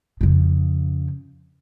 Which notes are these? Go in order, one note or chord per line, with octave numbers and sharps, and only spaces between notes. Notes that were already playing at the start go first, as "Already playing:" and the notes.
F2 C#3